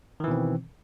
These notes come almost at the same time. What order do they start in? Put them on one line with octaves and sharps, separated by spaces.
D#3 E3 B2 C4